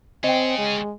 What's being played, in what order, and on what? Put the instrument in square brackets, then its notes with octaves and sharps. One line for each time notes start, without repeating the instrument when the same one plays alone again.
[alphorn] C4 [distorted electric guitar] G#4 C#5 [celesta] D#5 G5
[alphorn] G#3